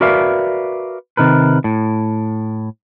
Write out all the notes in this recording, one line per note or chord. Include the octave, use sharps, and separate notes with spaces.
F#4 A#4 B4 D5 E5 F5
C3 D#3 A#4 B4
A2